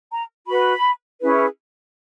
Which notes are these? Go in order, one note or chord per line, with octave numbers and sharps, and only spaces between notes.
A#5
F#4 B4 B5
C#4 E4 G#4 B4